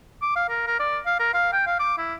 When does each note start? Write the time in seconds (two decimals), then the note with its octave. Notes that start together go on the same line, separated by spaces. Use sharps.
0.22 D6
0.36 F5
0.49 A#4
0.67 A#4
0.80 D5
1.06 F5
1.19 A#4
1.34 F5
1.53 G5
1.67 F5
1.80 D6
1.98 E4